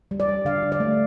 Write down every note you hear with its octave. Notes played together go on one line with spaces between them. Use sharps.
G3
D5
G3
D3 F5
D3
D5
A3